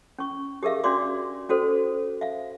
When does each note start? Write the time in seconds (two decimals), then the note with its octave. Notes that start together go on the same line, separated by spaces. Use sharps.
0.19 C#4 C#6
0.63 G4 G#4 A#4 E5 F5
0.84 C#4 D4 F#4 D5 C6 D6
1.49 C#4 F#4 A4 C5
2.21 E5 F5